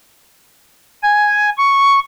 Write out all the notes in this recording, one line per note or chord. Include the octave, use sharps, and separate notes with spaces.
G#5
C#6